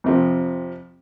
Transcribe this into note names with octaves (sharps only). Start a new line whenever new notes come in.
F2 C3 F3